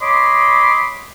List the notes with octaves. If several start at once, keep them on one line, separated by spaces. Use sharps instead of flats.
C#5 D#5 B5 C6 D6